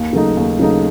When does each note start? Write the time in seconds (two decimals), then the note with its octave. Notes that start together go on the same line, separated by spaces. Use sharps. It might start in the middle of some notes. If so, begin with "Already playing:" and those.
Already playing: D#2
0.13 C#3 F#3 A3 D#4
0.37 D#2
0.59 C#3 F#3 A3 D#4